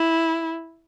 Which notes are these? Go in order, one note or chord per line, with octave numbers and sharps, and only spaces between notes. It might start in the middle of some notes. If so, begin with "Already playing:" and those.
Already playing: E4